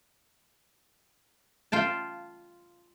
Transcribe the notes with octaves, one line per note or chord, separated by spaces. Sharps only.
F4 G5 A5